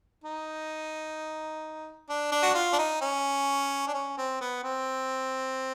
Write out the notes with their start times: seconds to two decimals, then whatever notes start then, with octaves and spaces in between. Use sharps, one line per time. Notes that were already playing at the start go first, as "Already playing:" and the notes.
0.24 D#4
2.09 D4
2.32 D4
2.43 F#4
2.54 F4
2.73 D4
2.79 D#4
3.01 C#4
3.88 D4
3.94 C#4
4.17 C4
4.41 B3
4.63 C4